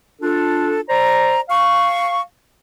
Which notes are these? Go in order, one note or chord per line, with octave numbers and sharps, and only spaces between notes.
D4 F4 A4
C5 D5 A#5
F5 C#6